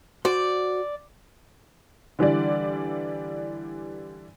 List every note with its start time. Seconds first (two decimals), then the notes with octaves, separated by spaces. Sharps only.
0.25 F#4 C5 D5
2.19 D3 E3 G3 D5